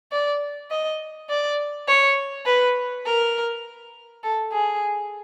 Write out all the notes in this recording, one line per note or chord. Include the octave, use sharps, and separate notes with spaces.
D5
D#5
D5
C#5
B4
A#4
A4
G#4